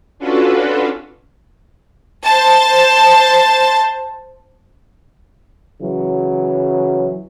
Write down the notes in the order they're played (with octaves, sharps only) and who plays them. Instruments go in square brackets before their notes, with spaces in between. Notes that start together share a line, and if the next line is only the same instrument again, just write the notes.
[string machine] C#4 D4 F4 F#4 A4 B4
[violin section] C5 A5
[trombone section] C#3 E3 F#3